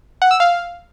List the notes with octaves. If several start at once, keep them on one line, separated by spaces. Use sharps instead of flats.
F#5
E6
F5